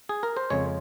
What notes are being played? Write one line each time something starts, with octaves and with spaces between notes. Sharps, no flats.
G#4
A#4
C5
F2 C#3 G#3 C#5